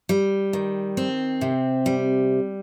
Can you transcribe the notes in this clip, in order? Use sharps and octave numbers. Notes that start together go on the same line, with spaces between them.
G3
D#3
C4
C3
G3